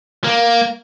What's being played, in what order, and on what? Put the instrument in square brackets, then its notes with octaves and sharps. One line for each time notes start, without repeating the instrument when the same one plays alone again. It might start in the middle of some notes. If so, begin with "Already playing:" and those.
[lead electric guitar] A#3